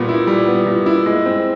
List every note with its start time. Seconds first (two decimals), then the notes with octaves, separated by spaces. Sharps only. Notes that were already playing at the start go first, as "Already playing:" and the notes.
Already playing: A#2 G3 B3
0.09 E4
0.27 G3
0.48 B3
0.67 A#2
0.86 E4
1.06 G#3
1.26 C4